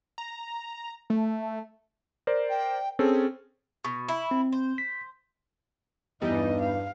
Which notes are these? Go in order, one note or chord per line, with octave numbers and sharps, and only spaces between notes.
A#5
A3
A#4 C5 D5
G5
C4 C#4 G#4 A4
B2 C#6
E4
C4
C5
B6
E2 G2 E3 G3 D#4 D#5
F5